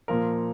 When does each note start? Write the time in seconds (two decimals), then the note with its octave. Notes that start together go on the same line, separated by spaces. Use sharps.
0.08 A#2 F3 A#4